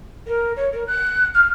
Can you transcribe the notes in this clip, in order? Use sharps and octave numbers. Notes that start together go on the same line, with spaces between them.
A#4
C#5
A#4
F#6
F6